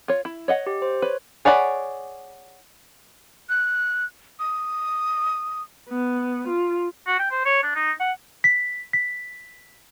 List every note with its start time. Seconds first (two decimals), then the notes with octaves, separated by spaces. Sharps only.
0.08 F4 C#5
0.25 E4
0.48 C#5 D#5 F#5
0.67 G4
0.82 C5
1.02 B4 C#5
1.45 G#4 C#5 D5 F#5 B5
3.49 F#6
4.39 D#6
5.89 B3
6.48 F4
7.07 F#4
7.19 G5
7.31 C5
7.45 C#5
7.63 D4
7.75 D#4
8.00 F#5
8.44 B6
8.93 B6